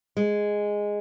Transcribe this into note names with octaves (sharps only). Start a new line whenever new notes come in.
G#3